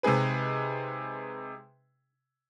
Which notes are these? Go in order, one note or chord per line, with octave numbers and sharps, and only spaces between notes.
C3 G#3 D#4 G#4 B4